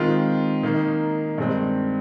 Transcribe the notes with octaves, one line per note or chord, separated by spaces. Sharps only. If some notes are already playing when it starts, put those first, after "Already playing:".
Already playing: D#3 G#3 C4 F4
D#3 A#3 D#4
G2 D#3 G#3 C4